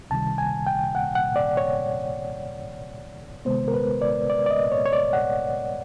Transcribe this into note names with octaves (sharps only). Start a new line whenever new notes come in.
C#2 C3 D#3 G3 A5
G#5
G5
F#5
F#5
D5
C#5
C3 D#3 G#3 B3 C5
A#4
B4
D5
D5
D5
D#5
C#5
C#5
D5
F#5